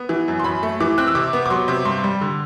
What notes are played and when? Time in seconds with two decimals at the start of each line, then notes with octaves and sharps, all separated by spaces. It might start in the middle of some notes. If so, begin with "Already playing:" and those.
Already playing: B3
0.09 E3
0.28 F#2
0.39 C6
0.44 F#2 B5
0.63 A3
0.80 E3 D6
0.98 C4 F#6
1.07 E6
1.15 C3 D6
1.33 B3
1.46 D6
1.50 F#3 C6
1.68 C3
1.85 G2 C6
2.04 G3
2.21 D3